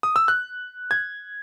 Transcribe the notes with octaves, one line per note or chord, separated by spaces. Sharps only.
D#6
E6
F#6
G#6